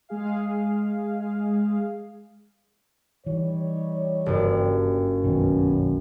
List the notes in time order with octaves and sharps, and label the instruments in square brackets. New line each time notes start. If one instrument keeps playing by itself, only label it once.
[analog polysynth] G#3 G#4 F5
[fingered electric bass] E3 [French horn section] G3 D#4 C#5
[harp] F#1 G2
[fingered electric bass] B1 F#2 D#3 [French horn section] B2 C#4